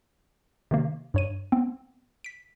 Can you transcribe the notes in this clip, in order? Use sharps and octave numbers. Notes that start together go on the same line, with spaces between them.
C3 D#3 A#3
G2 C#5 D#7
B3 C4
B6 D7